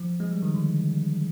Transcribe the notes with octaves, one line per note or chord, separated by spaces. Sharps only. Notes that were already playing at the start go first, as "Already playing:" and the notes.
Already playing: F3
G#3
G3
D#3
D3